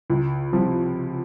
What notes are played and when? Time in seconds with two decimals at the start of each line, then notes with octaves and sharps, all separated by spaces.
0.10 C#2
0.52 C3 F3